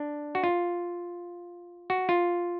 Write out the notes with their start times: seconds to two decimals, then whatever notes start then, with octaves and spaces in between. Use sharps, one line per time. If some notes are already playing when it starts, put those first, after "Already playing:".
Already playing: D4
0.35 F#4
0.44 F4
1.90 F#4
2.09 F4